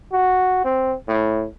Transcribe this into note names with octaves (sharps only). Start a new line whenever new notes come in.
F#4
C4
A2